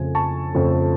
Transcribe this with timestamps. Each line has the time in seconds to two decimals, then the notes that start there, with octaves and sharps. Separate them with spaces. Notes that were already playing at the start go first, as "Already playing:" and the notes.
Already playing: F2 C#3 F3 A3 G#5
0.15 A5 C#6
0.54 F2 C#3 F3 A3